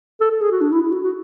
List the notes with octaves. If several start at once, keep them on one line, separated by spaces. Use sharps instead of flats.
A4
A4
G#4
F#4
D4
E4
E4
F#4
F#4